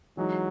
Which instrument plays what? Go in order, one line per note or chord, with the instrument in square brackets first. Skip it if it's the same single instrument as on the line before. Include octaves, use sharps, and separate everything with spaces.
[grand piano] E3 G#3 D#4 F#4 [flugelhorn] F#3